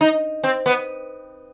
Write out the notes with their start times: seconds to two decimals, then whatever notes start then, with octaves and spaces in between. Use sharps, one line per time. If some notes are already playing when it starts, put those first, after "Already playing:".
0.01 D#4
0.44 C4
0.66 B3